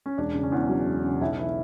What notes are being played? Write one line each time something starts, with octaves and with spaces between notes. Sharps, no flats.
C#4
E1 D4
C#3
C#4
E2
F#3
E1
C#3
B1 E4
E3 E4